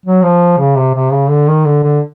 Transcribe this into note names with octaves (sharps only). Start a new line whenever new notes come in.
F#3
F3
C#3
C3
C3
C#3
D3
D#3
D3
D3